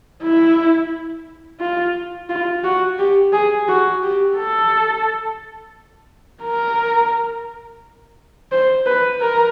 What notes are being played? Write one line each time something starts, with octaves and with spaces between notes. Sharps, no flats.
E4
F4
F4
F#4
G4
G#4
F#4
G4
A4
A#4
C5
B4
A#4